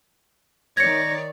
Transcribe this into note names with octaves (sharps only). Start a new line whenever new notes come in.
D#3 C#5 D5 G#6 A#6 C#7